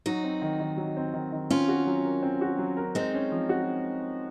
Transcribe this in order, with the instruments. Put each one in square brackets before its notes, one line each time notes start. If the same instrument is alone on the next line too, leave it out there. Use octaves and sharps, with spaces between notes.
[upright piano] F#3 [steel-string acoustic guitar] D#4 F#4
[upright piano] C4
D#3
D#3
F#3
C4
D#3
D#3
[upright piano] C4 [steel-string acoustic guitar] C#4 F4
[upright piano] F#4
F#3
A#4
C4
F#4
F#3
A#4
[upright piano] G#3 [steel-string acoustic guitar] C4 D#4
[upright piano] C#4
F3
F#4